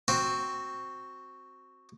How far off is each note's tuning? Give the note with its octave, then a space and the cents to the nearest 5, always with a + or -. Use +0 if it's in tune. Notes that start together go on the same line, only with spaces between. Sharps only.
C4 +0 F#4 +0